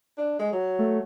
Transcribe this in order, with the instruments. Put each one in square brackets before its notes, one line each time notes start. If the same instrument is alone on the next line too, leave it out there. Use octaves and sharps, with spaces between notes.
[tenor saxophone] D4
G#3
F#3
[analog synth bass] A3